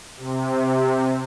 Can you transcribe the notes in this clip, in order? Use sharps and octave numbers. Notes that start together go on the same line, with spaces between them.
C3